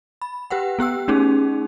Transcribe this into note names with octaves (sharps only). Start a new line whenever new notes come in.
B5
G4 B4 F#5 G5
B3 G4 G5 E6
A3 C#4 D#4 G#4